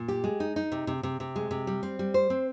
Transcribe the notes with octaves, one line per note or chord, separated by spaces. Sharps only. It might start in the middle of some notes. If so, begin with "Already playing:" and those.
Already playing: A#2
G4
G#3
D#4
D#4
C3
C3
C3
C3
G#3
C3
G3
C4
G3
C5
C4